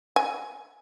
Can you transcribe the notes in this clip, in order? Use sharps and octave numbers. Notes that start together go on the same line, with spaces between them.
G#5